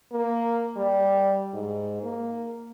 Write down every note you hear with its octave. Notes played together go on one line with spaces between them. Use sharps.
A#3
G3
G#2
A#3